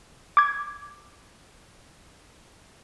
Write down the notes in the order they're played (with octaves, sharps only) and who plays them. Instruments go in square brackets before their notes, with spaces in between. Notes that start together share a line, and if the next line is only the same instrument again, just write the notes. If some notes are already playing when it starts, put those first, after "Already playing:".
[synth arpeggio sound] D6 G#6